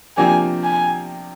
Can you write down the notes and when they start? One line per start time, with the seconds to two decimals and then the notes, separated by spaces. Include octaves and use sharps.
0.17 C3 F3 A#3 D4 G4 G#5
0.64 G#5